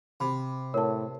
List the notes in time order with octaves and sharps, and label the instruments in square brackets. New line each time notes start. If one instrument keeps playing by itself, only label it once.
[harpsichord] C3 [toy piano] B5
[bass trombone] A2 [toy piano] A#4 [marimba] C#5 A5